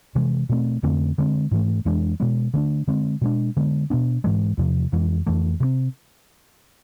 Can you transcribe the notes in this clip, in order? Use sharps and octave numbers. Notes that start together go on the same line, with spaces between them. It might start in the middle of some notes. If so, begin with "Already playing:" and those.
C3 E3 G#3
B2 A3 C4
F2 D3 A3 C4
D3 G#3 C4
G#2 E3 A3
F2 E3 G#3 D4
B2 G#3 B3
D3 A3 D4
D3 G#3 C4
B2 G#3 D4
D3 G#3 B3
B2 B3 D4
G#2 E3 G#3
E2 C3 F3
F2 E3 G#3
F2 E3 A3
C3 G#3 C4